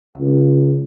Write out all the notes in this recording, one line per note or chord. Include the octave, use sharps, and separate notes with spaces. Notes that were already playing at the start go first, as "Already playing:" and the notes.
C#2